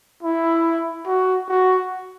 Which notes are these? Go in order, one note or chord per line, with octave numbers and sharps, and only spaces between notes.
E4
F#4
F#4